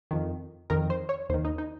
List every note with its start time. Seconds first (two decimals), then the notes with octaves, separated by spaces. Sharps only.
0.11 F2 D#3
0.70 F2 D#3 A#4
0.90 C5
1.09 C#5
1.29 D#2 C5
1.34 D#3
1.45 D#4
1.58 D#4